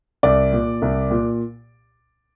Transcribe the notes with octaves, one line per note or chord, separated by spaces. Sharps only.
C2 D5
A#2
C2
A#2